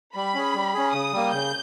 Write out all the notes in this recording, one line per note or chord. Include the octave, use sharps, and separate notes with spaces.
G3 B5
C#4 G#4
G3
C#4 G#4
C#3 D#6
G3 A#3
C#3 G6